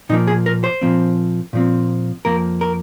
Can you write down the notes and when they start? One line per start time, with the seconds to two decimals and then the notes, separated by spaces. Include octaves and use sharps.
0.09 A#2 F3 A#3 D#4
0.27 G#4
0.46 A#4
0.64 C5
0.82 A#2 F3 C4
1.53 A#2 F3 C4
2.25 F2 F3 A#3 A#4
2.61 A#4